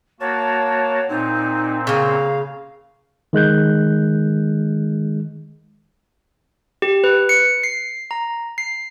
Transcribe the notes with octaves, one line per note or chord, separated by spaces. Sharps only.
A#3 F#4 C#5 A5
A#2 C4 D#4
C#3 A#3 F5
D#3 G#3 F#6 G6
G4
B4
C#7
C7
A#5
C7